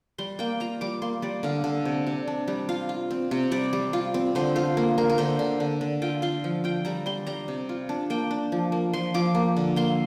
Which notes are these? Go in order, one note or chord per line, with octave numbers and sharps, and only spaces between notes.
G3 C6
A#3 G5
F4 A#5
G3 D6
A#3 C6
G3 D5
D3 F5
D3
C3
C3
D4
G3
F4 F5
F4
C4
C3
G3 D5
G3
F4
C4
D3 C5
F4 C5
A#3
A#3 A#4
A#4
D3 C5
D3
D3
D3
F4 G5
F4 C6
F3
F4 G5
G3 A#5
G3 C6
G3 A#5
C3
F4
D4
A#3 G5
D4
F3
A#3
F3 C6
F3 D6
A#3
D3
A#3 C6